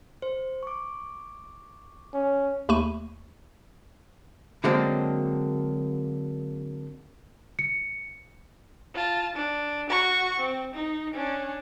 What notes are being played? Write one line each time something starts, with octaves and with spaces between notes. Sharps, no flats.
C5
C#6 D6
C#4
D#2 A3 A#3 B5 C#6 D#7
D3 F#3 G#3 A#3 C4 D4
C#7
F4 A5
D4
F#4 C#6
C4
D#4
C#4 D4